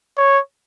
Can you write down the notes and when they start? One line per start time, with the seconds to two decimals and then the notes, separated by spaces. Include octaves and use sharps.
0.18 C#5